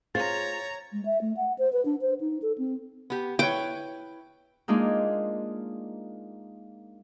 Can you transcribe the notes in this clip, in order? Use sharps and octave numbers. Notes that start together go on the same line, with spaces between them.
F4 G#4 C5 C#5 A#5 A6
G#3
E5
A3
F#5
C5
B4
D4
C5
D#4
A4
C4
B3 G4
E4 B4 C#5 G5
G#3 A#3 D4 D#4 F4 G#4